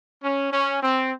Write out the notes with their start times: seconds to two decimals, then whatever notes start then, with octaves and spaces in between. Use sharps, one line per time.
0.23 C#4
0.52 C#4
0.81 C4